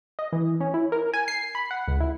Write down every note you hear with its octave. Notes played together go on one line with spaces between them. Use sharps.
D#5
E3
C#4
E4
A#4
G#5
C7
B5
F#5
C#2
E4